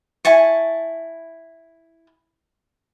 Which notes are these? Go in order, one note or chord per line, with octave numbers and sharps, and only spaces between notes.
E4 G#5 A5 C#6